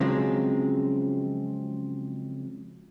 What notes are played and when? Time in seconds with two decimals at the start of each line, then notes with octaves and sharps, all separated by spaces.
0.01 C#3 F3 F#3 G#3 C4